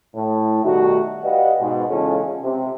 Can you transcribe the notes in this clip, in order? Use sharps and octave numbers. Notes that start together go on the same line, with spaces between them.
A2
B2 D#3 G3 A3 D#4 F#4
G4 B4 D5 D#5 F5 F#5
G#2 B2
E2 C#3 G#3 C#4 F4 A4
C3